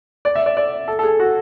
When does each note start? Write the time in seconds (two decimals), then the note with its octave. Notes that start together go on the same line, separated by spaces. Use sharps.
0.25 D5
0.35 E5
0.46 D5
0.57 D5
0.88 A4
0.99 A4
1.03 G#4
1.19 F#4